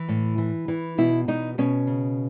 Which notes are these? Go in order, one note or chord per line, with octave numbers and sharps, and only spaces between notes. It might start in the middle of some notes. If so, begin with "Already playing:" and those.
Already playing: E3
A2
E3
E3
B2 E4
B2 D#4
B2 C#4
C#3